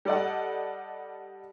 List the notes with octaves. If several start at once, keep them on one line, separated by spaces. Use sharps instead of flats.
G3 A4 D5 D#5 F#5